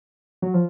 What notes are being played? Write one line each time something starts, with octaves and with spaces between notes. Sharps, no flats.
F#3
F3